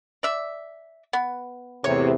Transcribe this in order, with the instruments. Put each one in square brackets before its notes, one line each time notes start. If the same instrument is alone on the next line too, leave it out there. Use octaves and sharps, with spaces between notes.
[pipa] D5 E5
B3
[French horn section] E2 A2 C3 [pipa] C#5